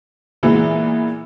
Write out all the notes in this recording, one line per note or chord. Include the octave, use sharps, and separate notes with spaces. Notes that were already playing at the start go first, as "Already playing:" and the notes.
A#2 E3 G#3 B3